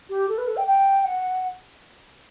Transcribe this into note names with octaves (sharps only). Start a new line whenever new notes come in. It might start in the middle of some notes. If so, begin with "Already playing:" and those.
G4
A4
B4
A4
G5
G5
F#5